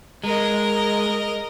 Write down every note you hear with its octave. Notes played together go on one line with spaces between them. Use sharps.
G#3 A#4 D#5